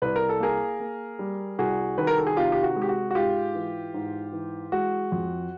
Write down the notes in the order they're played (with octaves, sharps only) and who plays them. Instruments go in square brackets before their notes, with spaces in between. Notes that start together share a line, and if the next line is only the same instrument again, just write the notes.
[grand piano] C2 B4
A#4
A4
A#3 G#4 A#4
A#3
G3
C2 F#4 G#4
D#3 B4
A#4
A4
G#4
C3 F4 G4
G4
F#4
G#3
G4
F#4
F#4
G#2 F4 G4
E3
G#2
E3
G#3 F#4
F2